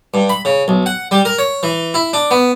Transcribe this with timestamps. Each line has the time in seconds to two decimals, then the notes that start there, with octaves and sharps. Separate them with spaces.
0.14 G2
0.29 B5
0.45 C#3
0.68 B1
0.86 F#5
1.11 G3
1.25 A#4
1.38 C#5
1.63 E3
1.94 E4
2.13 D4
2.31 B3